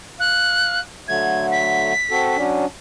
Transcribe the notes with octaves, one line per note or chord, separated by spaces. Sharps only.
F5 F#6
D3 F#3 A3 G#6
B6
C4 F#4 A4
F#3 C#4 D4